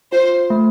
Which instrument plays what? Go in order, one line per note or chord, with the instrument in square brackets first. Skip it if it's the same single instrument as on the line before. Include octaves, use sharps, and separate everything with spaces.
[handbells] F4 [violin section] C5
[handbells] A3